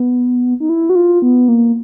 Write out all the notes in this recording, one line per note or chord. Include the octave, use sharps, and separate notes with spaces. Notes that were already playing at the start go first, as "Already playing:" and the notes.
Already playing: B3
D#4
E4
F#4
F4
B3
A#3